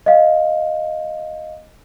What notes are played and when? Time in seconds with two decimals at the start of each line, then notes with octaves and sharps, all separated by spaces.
0.06 D#5 F5